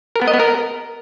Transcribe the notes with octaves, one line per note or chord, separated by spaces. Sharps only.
A#4
B3
D#5
B3
A#4